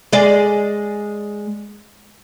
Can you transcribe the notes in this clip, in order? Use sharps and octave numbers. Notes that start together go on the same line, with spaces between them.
G#3 D5